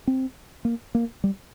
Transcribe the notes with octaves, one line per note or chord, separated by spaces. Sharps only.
C4
A#3
A#3
G3